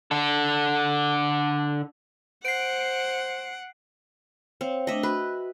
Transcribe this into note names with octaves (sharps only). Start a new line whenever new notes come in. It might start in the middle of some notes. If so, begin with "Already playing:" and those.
D3 A4
C5 F#5 C7 D7
C4 C#5 F5
A3 D4 D#5 E5
F#4 B4